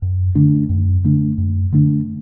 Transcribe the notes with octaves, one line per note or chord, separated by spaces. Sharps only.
F#2
D3 A3 D4
F#2
D3 A3 D4
F#2
D3 A3 D4